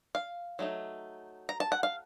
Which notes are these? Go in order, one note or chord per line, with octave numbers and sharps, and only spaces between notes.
F5
F#3 A3 D#4
A#5
A5
F#5
F5